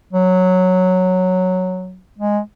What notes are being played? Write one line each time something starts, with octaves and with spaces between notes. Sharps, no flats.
F#3
G#3